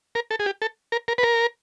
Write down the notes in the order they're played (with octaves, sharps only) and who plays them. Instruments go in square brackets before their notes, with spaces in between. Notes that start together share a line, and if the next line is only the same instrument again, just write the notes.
[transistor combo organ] A#4
A4
G#4
G4
A4
A#4
A#4
B4
A#4